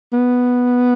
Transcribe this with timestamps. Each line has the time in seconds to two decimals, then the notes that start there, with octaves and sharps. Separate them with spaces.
0.13 B3